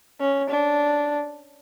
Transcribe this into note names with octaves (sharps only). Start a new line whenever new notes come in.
C#4
D4